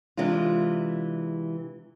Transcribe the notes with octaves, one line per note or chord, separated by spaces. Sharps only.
C3 E3 G#3 D4 F4